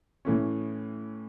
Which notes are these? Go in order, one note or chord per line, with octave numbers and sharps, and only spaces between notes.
A2 E3 A3 C#4